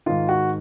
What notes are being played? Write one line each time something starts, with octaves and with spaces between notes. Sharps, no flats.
G#2 D#3 F4
F#4